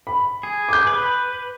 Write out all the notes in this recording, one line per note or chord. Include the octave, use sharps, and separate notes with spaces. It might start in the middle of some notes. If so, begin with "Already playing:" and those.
B5
G#4
D6 G6
B4